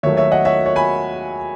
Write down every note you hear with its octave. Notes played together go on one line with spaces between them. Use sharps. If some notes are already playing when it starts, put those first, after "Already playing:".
D#2 D#3 F#3 A3 C#5 E5
C#5 E5
D#5 F#5
C#5 E5
C#5
G#5 B5